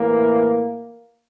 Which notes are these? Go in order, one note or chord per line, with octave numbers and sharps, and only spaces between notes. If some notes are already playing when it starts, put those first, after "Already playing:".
Already playing: A2 E3 A#3